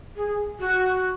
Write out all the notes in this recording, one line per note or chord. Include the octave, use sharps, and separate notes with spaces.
G#4
F#4